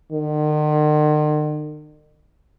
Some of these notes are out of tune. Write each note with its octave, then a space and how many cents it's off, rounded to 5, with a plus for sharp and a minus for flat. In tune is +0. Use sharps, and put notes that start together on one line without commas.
D#3 -45